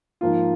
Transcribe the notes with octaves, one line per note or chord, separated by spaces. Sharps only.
G#2 F3 A#3 F4